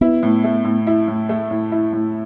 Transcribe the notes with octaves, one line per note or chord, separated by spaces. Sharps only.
B3 E4
A2
A3
A2
E4
A2
A3
A2
E4
A2